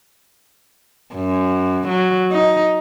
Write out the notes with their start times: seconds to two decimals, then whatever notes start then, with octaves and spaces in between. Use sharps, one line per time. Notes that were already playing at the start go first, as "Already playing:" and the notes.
1.14 F#2
1.88 F#3
2.32 D#4